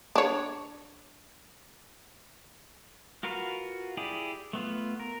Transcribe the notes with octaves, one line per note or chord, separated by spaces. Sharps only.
D4 C#5
F4 F#4 A#4 B4 F5
E4 G4 G#4 D5
A3 B3 F4
A#4